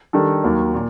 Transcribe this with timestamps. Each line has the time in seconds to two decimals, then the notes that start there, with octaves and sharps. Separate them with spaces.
0.13 D#3 G3 D4 A4
0.44 D#2 D#3 F#3
0.74 A#2